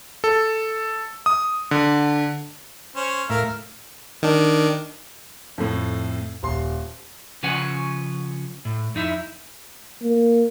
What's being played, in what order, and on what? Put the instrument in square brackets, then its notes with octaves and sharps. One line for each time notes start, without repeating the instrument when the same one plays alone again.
[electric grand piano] A4
D#6
D3
[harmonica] C#4 C5
[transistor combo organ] A2 E5 [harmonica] A#4 F5
[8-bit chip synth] D#3 D4
[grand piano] F2 A2
D#1 C6
[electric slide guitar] C#3 F3 C#4 B4 F#5 G#5
A2
F2 D#4 E4
[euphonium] A#3